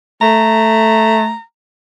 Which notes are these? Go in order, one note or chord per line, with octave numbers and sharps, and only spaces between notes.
A3 A#5